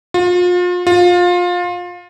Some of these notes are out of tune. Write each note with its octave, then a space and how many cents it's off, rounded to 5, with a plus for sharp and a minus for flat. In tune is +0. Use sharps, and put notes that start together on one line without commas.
F4 +35
F4 +25